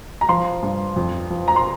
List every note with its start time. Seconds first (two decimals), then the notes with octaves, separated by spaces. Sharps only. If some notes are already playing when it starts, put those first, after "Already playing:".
0.21 A#5
0.29 F3 C6
0.63 G2
0.96 F2
1.30 F3
1.48 A#5
1.56 C6